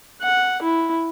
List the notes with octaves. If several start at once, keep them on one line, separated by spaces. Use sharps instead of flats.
F#5
E4